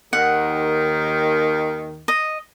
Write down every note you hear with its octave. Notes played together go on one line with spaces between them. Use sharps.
D#2 D#3 F#5
D#5